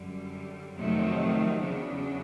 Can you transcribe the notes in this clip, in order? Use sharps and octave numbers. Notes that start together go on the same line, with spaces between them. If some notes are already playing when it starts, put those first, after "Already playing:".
Already playing: F#2 D3 G3
F2 C3 D#3 F#3 A3
E2 C#3 F#3 B3 D4